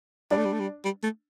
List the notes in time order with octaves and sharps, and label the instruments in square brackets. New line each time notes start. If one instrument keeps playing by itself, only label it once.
[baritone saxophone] G3 [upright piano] D4
[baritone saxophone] A3
G3
A3
G3
G3
A3